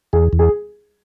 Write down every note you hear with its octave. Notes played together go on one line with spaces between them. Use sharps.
E2 G#4
E2
G#4